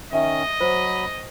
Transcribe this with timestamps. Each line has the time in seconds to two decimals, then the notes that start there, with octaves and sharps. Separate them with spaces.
0.13 D#3 C#4 D#5 E5
0.61 F#3 C5 B5